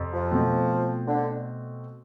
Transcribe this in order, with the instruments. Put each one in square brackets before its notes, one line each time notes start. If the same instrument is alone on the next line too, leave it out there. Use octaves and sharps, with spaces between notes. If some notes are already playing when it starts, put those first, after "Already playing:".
Already playing: [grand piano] F2 C3
[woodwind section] F3
[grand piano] B2 A3 C4
[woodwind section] D3